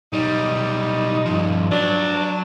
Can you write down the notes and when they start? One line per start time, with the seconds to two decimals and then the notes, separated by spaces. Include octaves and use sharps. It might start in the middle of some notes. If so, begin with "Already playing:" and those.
0.13 B1 G3 D#4
1.26 G2 F3
1.71 F#3 D4